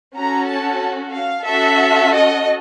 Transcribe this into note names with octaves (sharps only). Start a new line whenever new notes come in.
C#4 F#4 A4 A#5
A5
F5
C#4 F#4 A4 E5
D#5